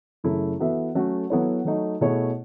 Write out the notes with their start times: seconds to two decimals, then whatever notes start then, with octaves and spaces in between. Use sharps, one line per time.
0.24 F#2 C#3 F#3 A3 E4
0.59 E3 B3 F#4 A4 E5
0.95 F#3 A3 C#4 F#4 A4
1.30 F#3 B3 E4 A4 C#5
1.65 F#3 A3 D#4 F#4
2.01 B2 A3 E4 G#4 C#5